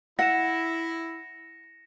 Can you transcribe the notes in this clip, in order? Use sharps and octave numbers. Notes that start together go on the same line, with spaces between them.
E4 F#5 A#6 C#7 E7